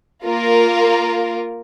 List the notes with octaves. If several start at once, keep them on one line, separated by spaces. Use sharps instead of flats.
A#3 F4 A#4